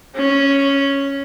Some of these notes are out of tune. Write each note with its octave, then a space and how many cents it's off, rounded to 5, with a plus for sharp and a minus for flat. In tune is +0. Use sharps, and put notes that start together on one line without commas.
C#4 +0